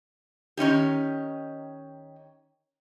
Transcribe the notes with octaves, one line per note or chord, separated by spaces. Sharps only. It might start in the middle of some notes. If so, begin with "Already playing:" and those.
D#3 C#4 D#4 G4